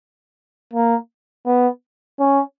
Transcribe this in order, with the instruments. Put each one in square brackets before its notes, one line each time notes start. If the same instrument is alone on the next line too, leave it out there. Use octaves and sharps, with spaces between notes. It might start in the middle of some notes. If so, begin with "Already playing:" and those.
[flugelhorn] A#3
B3
C#4